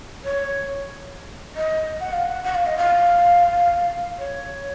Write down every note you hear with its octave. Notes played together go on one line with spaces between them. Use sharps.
C#5
D#5
F#5
F5
F#5
F#5
F5
D#5
F5
C#5